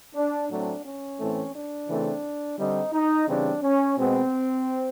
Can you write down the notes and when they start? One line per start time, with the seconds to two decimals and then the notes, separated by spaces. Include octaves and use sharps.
0.15 D4
0.50 A2 F#3 A3 C4 D4
0.85 C#4
1.20 A2 E3 A3 C4
1.53 D4
1.89 C#3 E3 A3 C4
2.58 D3 G3 C4 D#4
2.93 D#4
3.27 C#3 E3 G3 C4 D4
3.62 C#4
3.97 B2 G#3 B3 C4